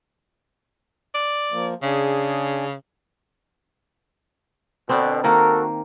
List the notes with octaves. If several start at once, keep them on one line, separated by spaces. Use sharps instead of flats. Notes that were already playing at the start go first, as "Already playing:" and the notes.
D5
F3 A#3
C#3 D4 G#4
B2 D3 C4 D4
D#3 A#3 F#4 A4 A#4